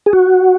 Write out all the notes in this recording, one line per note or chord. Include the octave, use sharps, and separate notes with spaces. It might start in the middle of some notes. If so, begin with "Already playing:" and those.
G#4
F#4